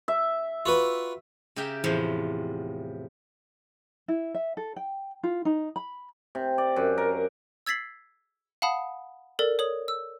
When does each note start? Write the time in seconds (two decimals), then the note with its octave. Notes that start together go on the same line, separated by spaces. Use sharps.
0.08 E5
0.66 F4 F#4 B4
1.56 C#3 G4 A#4 E5 G5
1.84 E2 A2 C3 F3
4.08 E4
4.34 E5
4.57 A4
4.76 G5
5.23 F4
5.45 D#4
5.76 B5
6.35 C3
6.58 D5
6.76 F#2
6.98 A#4
7.66 E6 G#6 A6 B6 C7 F#7
8.62 F5 F#5 A5 B5 D#6
9.39 A4 A#4 D5
9.59 C#5 D#6 F#7
9.88 E6